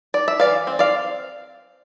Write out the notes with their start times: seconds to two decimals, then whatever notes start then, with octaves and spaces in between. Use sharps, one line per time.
0.14 D5
0.28 E5
0.40 E3 D5 F5
0.67 C4
0.79 D5 F5